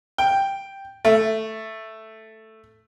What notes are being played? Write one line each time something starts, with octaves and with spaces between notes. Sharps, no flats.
G5
A3